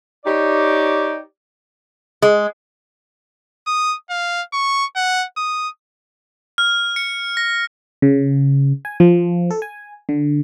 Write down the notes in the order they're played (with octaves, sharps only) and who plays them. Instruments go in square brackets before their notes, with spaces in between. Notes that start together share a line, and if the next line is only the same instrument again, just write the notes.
[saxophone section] D#4 G4 C#5 D5
[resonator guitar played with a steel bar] G#3
[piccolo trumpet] D#6
F5
C#6
F#5
D#6
[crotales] F6
C#7
A#6
[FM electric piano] C#3
G#5
F3
A4
G#5
D3